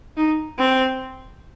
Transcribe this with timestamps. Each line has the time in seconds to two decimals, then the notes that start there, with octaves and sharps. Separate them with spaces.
0.17 D#4
0.58 C4